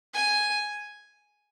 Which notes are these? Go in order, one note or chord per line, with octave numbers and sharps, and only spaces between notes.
G#5